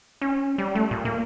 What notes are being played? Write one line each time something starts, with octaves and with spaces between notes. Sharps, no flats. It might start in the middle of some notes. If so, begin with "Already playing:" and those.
C#4
G3
A3
A#2
A#3